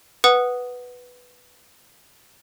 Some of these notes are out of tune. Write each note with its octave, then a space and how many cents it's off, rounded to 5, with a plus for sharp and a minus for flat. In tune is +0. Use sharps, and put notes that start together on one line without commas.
B4 +0 F#5 +0 D#6 -10